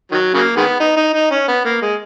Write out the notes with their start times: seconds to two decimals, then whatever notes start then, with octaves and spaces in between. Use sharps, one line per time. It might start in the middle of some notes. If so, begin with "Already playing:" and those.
0.12 D#3 F#3
0.34 C#3 F#3 A#3
0.57 D#3 G#3 B3
0.80 D#4
0.97 D#4
1.14 D#4
1.31 C#4
1.48 B3
1.65 A#3
1.82 G#3